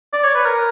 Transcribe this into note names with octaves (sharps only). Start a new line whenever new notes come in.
D5
C#5
B4
A#4